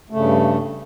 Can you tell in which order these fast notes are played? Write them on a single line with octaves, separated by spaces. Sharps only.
A3 C#3 G2